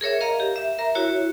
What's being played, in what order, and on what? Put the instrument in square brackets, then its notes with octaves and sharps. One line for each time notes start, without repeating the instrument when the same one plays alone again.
[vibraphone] G#4 A#4 C#5 E5
A#4 D#5 F5 A#5
G4
E5
A#4 E5 A#5
E4 F#4 C#5